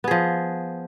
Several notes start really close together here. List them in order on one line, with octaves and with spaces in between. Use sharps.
B3 G#4 F3